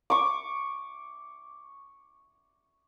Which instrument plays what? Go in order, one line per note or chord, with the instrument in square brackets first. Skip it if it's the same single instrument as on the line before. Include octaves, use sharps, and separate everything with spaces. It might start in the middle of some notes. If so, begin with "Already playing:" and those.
[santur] C#6 D6